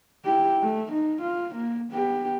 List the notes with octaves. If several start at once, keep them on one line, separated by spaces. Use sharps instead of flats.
E4 G4
A3
D#4
F4
A#3
B3 G4